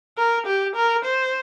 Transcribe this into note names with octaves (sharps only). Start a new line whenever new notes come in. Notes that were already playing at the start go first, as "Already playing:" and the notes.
A#4
G4
A#4
C5